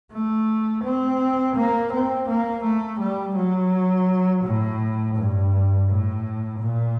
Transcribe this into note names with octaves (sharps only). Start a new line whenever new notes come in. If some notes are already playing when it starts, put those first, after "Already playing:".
A3
C4
A#3
C4
A#3
A3
G3
F#3
A2
G2
A2
A#2